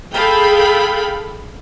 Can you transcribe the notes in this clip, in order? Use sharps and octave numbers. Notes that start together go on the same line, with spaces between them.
G#4 A4 F5 G5 B5